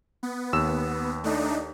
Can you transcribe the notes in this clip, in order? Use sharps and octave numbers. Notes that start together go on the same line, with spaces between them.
B3
D#2 E6 E7
A3 D4 D#4